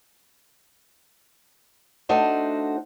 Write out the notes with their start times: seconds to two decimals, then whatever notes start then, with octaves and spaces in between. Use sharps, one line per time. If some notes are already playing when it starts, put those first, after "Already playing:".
2.09 A3 D4 D#4 F#4 C5